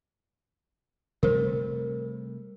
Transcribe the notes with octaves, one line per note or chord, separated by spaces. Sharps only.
C3 G3 A3 A#4 C5